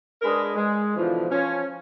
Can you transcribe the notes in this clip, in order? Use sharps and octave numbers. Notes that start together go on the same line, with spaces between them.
G#3 D4 G#4 A#4 B4 D#5
G#3
B2 D3 E3 F3
F3 C#4